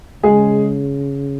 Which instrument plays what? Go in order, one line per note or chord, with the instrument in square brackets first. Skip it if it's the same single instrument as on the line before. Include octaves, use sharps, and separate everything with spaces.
[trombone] C#3 [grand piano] G#3 G#4